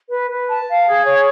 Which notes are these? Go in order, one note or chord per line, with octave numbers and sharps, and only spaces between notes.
B4
B4
A5
F5
G#4
C#5